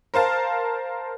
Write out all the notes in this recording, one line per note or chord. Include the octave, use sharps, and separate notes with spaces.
A#4 C5 F5 A5